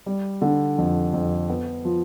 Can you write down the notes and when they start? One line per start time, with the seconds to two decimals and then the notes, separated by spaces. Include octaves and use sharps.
0.06 G3
0.42 D3
0.78 F2
1.14 F2
1.49 B3
1.85 F3